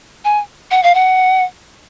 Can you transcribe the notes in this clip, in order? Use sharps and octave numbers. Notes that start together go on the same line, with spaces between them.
G#5
F#5
F5
F#5